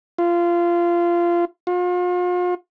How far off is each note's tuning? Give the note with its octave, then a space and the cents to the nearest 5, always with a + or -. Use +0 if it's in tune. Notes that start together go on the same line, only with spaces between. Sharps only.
F4 -20
F4 +40